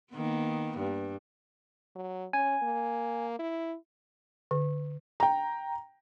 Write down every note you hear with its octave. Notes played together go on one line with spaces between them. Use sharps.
D#3 A#3 B3
G2
F#3
C#4 G#5
A#3
E4
D3
G5 A#5